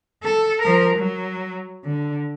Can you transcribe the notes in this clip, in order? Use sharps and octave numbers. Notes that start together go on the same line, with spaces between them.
A4
F3 A#4
F#3
D3